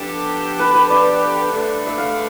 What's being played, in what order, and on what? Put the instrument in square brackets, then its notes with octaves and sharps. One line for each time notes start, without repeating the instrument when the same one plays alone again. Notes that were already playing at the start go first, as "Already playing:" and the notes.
Already playing: [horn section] F3 B3 D4 G4 [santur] A4
[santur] B4
B4
D5
[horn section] G2 D3 A3 D4
[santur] E5
F5